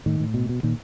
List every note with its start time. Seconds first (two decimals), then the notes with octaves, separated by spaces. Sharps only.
0.06 A2 D#3
0.20 A2
0.34 B2
0.49 B2
0.63 A#2 D#3